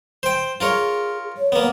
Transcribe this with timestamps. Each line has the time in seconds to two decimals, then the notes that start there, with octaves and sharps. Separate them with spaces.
0.23 C5 G5
0.60 F4 G#4 A#4 C#5
1.37 C#5
1.52 A#3 B3